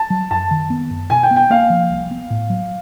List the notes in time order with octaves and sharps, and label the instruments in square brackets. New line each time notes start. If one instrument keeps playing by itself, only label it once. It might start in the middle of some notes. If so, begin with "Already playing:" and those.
Already playing: [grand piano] A5
[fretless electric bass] F#3
[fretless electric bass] F#2 [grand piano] A5
[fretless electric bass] D#3
B3
F#2
[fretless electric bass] B2 [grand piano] G#5
[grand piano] G5
[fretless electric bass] B3
[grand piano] G5
[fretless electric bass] A#3 [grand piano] F5
[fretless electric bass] F3
C2
B3
A2
F#3